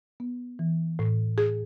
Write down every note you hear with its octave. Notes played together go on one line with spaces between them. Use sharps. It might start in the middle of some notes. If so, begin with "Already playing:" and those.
B3
E3
A2
G#4